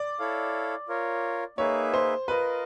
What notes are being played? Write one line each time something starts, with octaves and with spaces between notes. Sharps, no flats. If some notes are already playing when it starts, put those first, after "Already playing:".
Already playing: D5
E4 A4 C#5 F5
F4 A#4 C#5
A#3 D#4 G#4 B4 C#5 E5
C5
F4 A#4 B4 D#5